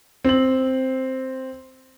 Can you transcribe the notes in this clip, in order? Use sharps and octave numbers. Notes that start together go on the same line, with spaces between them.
C4 F#7